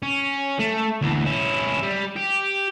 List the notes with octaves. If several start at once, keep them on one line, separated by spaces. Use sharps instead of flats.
C#4
A3
D2 E3
C#4 E4
G3
G4